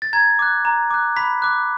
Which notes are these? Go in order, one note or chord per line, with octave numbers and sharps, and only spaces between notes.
A6
A#5 G#6
D6 F#6
A#5
D6 F#6
B5 B6
D6 F#6